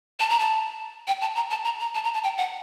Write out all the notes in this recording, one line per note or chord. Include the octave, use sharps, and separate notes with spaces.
A5
A#5
A5
G5
A5
A#5
A5
A#5
A#5
A5
A#5
A5
G5
F#5